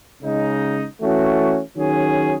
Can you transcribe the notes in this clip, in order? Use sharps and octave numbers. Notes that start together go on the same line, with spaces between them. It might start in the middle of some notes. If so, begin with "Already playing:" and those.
C#3 G#3 D#4
E3 A3 C#4 F#4
D#3 F#3 C#4 G#4